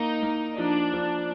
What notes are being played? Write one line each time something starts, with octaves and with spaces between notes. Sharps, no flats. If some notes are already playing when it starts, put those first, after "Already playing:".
Already playing: A#3 D#4
A#3
F3 D4
F3